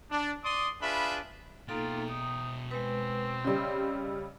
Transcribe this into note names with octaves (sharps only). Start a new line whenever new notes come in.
D4
D5 C6 D6 D#6
D4 F4 G#4 B4 E5 B5
B2 A#3 D#4 F4 A4 G5
D#4 D#6
G#3 C4 B4
C#3 G3 D#5 E6